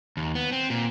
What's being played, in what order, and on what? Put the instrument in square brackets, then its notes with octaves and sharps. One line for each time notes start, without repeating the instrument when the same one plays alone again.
[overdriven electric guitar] D#2
B3
C4
A#2